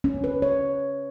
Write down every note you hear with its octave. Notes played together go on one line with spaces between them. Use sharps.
C#4
B4
C#5